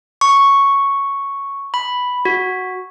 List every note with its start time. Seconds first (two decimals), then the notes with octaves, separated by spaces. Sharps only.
0.21 C#6
1.74 B5
2.25 F#4